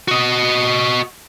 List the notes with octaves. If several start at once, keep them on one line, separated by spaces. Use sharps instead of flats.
F#4 D#5